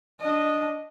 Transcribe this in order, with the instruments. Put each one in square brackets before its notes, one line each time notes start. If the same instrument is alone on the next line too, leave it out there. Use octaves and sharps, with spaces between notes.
[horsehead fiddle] D4 D#5